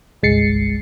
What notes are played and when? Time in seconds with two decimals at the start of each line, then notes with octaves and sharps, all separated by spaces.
0.23 G1 C2 G#3 A6 C7 C#7